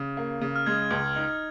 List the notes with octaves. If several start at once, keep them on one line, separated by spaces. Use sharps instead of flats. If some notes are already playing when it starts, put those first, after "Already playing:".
Already playing: C#3
A#3
C#3
F6
G#3 G#6
C#2
D#4